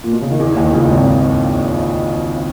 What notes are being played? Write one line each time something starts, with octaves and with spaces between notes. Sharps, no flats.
A#2
B2
C#3
D#3
E2 E3
D#2 D#3
C#2 C#3
G#1 G#2